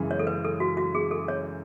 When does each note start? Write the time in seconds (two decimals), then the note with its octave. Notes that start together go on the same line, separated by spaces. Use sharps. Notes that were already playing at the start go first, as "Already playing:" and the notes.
Already playing: F#2 C#3 E3 G#3
0.11 C#5
0.19 A4
0.27 B4
0.44 A4
0.60 F#4
0.77 F#4
0.95 G#4
1.11 A4
1.28 C#5